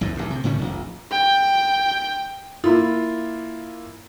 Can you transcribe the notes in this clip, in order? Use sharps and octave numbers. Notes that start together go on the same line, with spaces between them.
A#1 E2 G#2 E3
A1 G2
C3
C#2 A2 D#3 C#4
F1 A#1
G5
A#3 E4 F4